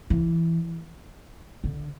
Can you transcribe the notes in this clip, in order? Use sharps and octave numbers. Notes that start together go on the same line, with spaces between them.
E3
D3